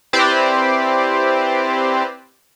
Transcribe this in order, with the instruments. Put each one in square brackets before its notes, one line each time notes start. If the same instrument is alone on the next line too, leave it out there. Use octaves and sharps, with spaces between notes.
[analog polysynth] C4 E4 G4 B4 C5 D5